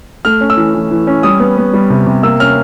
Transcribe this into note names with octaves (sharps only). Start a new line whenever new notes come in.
A3 F6
C#4
E6
E3
E3
E3
C#4
G3 D#6
B3
B3
G3
C3
C3
A#3 E6
C#4 F6